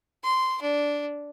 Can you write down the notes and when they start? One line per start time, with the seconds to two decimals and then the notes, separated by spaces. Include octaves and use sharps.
0.24 C6
0.62 D4